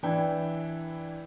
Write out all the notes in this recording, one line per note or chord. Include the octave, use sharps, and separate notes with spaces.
E3 D4 E4 B4 G5